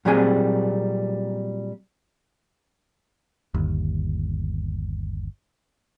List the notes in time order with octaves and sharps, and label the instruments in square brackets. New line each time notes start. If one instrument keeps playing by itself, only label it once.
[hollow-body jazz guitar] A#2 F#3 G3 C4 G#4 G#5
[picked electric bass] G1 D#2